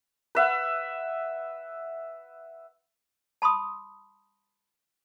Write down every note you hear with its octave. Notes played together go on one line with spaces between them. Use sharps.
B4 E5 F#5
A5 B5 C6 D#6